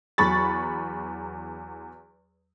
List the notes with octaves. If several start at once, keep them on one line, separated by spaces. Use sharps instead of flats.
E2 F#3 B5 C#6 A6